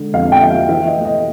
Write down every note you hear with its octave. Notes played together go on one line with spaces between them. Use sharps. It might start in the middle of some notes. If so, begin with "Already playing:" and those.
Already playing: D3 G#3
F2 F5
G5
F3 E5
F5
E3 E5
D#5
A3
D#5